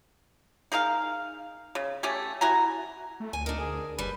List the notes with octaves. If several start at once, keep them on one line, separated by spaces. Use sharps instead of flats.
D#4 G#4 A#4 F5
C#3
A3 C#4 G4 G#5
E4 F#4 G#5 A#5
A3
D2 G#5
D4 D#4 A#4
G#4
F#1 G3 B4